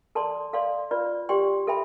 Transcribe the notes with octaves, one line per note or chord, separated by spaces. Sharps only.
A4 D5 A5 C6
A4 D5 F5 C6
F4 B4 D5
G4 D5 G5 C6
A4 E5 G5 B5